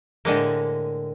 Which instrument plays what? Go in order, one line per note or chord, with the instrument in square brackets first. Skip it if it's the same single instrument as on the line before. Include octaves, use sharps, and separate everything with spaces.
[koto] A2 D3 G#3 A#3